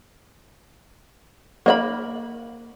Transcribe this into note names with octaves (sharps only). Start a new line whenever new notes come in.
A#3 D#5 B5